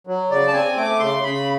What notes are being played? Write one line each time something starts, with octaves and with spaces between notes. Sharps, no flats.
F#3
C#3 D5
A5
C4 G#5
A3 D6
C#3 C6
C#3 B5